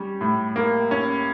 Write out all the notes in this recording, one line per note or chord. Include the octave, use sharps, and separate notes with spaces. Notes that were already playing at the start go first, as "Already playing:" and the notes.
Already playing: G3 C#4
A2
A#3
C#4